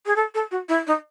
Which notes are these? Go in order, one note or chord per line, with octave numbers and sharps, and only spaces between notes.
G#4
A4
A4
F#4
E4
D#4